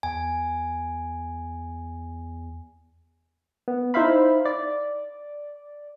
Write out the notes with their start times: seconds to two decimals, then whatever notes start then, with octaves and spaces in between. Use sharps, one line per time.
0.03 E2 G#5
3.68 B3
3.94 D#4 E4 C5 E5 F5 B5
4.45 D5